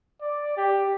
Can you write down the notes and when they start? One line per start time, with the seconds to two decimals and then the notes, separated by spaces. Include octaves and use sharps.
0.21 D5
0.57 G4